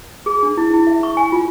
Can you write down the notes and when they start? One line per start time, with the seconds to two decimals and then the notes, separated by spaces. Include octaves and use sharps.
0.26 G#4
0.43 D4
0.57 E4
0.74 E4
0.87 E5
1.03 C#6
1.17 G#5
1.32 F4